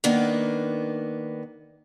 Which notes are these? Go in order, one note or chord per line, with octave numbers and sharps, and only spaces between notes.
D#3 A#3 B3 D4